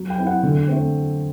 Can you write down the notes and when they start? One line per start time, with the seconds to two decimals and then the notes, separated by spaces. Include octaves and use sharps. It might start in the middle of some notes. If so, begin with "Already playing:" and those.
Already playing: F#3
0.10 G5
0.18 C4 E4
0.27 F#5
0.43 D3
0.68 A3 C4